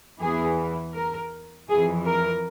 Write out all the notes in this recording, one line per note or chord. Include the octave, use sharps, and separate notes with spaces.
E2 E3 G#4
A#4
F2 E3 G#4
A#4